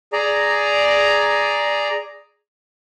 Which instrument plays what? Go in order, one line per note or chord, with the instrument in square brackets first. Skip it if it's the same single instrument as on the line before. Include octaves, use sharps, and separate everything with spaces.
[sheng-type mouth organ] G#4 D5 A#5